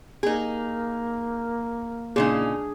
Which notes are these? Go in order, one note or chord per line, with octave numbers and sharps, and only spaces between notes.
A#3 D#4 G#4
A#2 C#3 D4 D#4 G#4